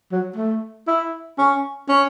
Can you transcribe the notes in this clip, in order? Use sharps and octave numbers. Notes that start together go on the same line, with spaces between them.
F#3
A3
E4
C#4
C#4